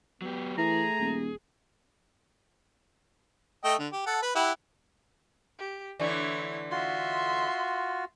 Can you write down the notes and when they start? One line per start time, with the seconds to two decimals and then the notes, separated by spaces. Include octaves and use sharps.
0.22 F#3 B3 G4
0.58 E3 A3 G#4 A#5
1.01 D#1
3.64 A3 D#5 G5
3.79 D3
3.92 G4
4.06 A4 F#5
4.22 B4 B5
4.35 E4 G4 F#5
5.59 G4
5.99 D3 E3 A3 E4 C#5
6.71 F4 F#4 E5 C6